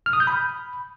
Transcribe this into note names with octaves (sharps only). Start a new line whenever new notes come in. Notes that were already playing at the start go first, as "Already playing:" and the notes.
F6
D#6
G6
B5